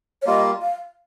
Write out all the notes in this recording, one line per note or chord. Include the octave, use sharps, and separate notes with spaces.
C#5
G3 A#3 F4 D#5
F5